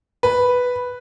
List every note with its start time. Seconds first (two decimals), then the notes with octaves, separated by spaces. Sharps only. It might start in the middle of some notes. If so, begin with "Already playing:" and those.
0.23 B4